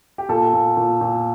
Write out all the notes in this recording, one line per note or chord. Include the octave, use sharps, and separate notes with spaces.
G4
A#2 A4
A#2
A#2
A#2